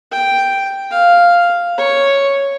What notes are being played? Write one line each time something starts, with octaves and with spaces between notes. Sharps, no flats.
G5
F5
C#5